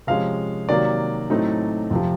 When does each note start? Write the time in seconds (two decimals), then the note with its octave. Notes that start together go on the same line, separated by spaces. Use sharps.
0.07 C3 F3 G#3 C#4 F5
0.69 C3 D#3 F#3 A#3 D5
1.30 A2 F#3 A3 C4 D#4
1.90 F2 C3 F3